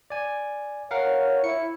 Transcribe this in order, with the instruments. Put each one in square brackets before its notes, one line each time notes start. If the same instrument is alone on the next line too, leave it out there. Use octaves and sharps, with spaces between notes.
[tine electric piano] D5 G#5
[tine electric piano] A#4 F5 F#5 [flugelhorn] C#5
[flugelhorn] E4 [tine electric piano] C#7